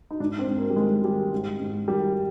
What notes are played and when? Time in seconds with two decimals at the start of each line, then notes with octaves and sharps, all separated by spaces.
0.11 D#4
0.20 G#2 D4
0.39 C4
0.48 G#2
0.58 A#3
0.70 G3
0.76 D#3 G#3
1.04 D#3 G3
1.33 G#2
1.60 G#2
1.88 D#3 G3